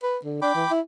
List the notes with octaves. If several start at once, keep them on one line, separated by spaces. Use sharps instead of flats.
B4
D3
D4 G5 B5 D6
E3
E4